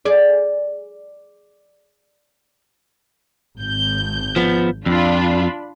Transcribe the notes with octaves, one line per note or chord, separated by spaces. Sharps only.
G#4 D5
G#1 G6
F3 B3
F2 D4 F4 B5